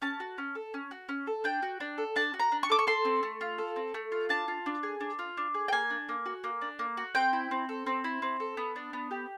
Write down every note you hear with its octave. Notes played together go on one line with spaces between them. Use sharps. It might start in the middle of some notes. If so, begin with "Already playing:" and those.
C#4 A5
F#4
C#4
A4
C#4
F#4
C#4
A4
D4 G5
F#4
D4
A4
D4 A5
F#4
A#5
D4
C#6
A4 D6
C#6
A4 C6
C4
A3
F4
A4
C4
A3
F4
D4 A5
F4
D4
G#4
D4
F4
D4
G#4
G5
A#3 G#5
D4
A#3
F#4
A#3
D4
A#3
F#4
C4 G5
E4
C4
A4
C4
E4
C4
A4
B3
D4
B3
G4